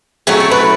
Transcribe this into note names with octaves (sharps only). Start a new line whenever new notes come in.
F#3 A3 C#4 E4 G#4
A4
B4